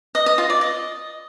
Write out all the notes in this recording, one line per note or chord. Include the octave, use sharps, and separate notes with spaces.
D#5
D#5
F4
D5
D#5